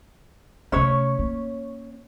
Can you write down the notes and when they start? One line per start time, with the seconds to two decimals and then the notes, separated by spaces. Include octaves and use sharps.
0.72 C3 A3 C#4 C#5
1.19 A#3